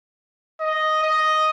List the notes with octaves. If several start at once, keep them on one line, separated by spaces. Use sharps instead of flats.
D#5
D#5